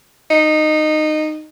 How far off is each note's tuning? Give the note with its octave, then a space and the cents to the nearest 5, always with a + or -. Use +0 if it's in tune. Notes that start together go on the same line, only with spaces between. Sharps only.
D#4 -15